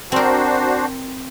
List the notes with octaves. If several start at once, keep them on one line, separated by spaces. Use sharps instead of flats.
C4 D4 F#4 A#4 C5